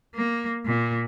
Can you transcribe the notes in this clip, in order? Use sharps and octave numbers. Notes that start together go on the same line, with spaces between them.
A#3
A#2